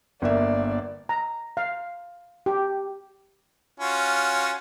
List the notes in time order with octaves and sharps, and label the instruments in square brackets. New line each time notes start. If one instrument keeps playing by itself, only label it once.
[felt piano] G1 A#3 E5 [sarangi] D5
[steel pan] A#5
F5
G4
[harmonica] C#4 F4 F#4